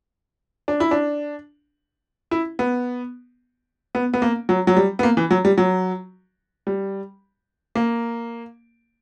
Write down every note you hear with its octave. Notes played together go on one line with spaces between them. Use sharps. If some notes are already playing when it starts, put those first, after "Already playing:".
D4
E4
D4
E4
B3
B3
B3
A#3
F#3
F#3
G3
B3
A#3
E3
F#3
G3
F#3
G3
A#3